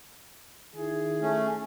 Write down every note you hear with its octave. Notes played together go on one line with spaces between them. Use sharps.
D#3 E4 G#4
A3 C#4